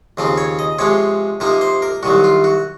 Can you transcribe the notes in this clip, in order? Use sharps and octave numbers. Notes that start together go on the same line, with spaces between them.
D#2 C#3 F3 C4
C#5
D#5
C3 F3 G#3 C#5
C3 F3 A#3 D#4
C5
A#4
C2 C3 D#3 F#3 F#4
F4
F#4